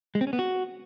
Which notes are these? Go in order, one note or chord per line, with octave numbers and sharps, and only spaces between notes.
G#3
C4
C#4
B3
F#4